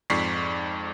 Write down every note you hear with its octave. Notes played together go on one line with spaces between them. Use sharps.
F2 G#2 D5 C#6 B6 C7